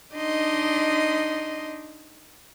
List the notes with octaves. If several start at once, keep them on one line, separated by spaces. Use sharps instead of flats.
D4 D#4 D#5 C6